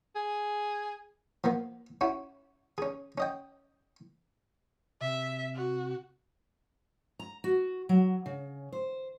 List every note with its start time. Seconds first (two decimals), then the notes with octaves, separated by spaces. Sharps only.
0.16 G#4
1.44 F3 A#3 B3
2.01 C#4 E4 F#4
2.78 C#4 G#4
3.18 C#4 D#5 G5
5.01 C3 E5
5.55 F#4
7.19 A#5
7.44 F#4
7.89 F#3
8.26 C#3
8.72 C5